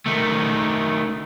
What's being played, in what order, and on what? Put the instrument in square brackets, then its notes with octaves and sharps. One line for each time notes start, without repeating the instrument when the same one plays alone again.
[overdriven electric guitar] D#3 A3